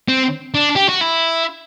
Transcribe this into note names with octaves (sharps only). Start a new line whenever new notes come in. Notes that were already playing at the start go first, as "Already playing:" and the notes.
C4
D4
G4
F#4
E4